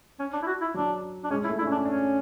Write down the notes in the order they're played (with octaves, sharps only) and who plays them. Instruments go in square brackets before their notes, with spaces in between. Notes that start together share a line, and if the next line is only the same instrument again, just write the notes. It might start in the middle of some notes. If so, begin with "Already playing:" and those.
[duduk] C#4
D4
E4
F#4
E4
[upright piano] F#3 [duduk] D4
[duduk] D4
[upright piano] G#3 [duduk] C#4
[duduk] E4
[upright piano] A3
[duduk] E4
[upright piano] D4
C#4
[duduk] D4
[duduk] C#4 [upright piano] D4